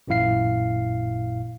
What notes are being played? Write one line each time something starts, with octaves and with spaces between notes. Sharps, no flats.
A1 F#2 A#2 E4 F5 C7